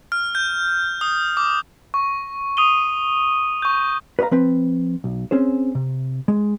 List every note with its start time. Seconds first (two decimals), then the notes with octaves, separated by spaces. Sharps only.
0.12 F6
0.35 G6
1.01 D#6
1.37 D6
1.94 C#6
2.57 D#6 D#7 G7
3.62 C#6 G6
4.19 B4 C#5 D#5 F5 A#5
4.31 F3 C4 B4
5.04 B1
5.31 C4 C#4 G#4 C5
5.75 C3
6.28 G#3